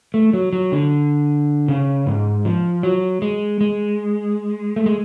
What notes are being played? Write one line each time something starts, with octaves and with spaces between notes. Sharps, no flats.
A3
F#3
F#3
D3
C#3
G#2
F3
F#3
G#3
G#3
A3
G#3